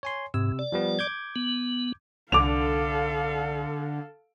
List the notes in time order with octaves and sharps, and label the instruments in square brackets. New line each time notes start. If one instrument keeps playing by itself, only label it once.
[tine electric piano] C#5 G#5 C6
[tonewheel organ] G#2 [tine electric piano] C3 E6
[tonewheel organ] D5
[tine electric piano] F3 G3 B3
D6 G6 G#6
[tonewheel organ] B3
[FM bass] C2 [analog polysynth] D3 [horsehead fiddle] A4 F5 [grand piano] D6 F7